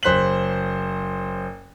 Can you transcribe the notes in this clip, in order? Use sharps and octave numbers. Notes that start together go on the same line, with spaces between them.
F#1 C5 F#6 B6 F#7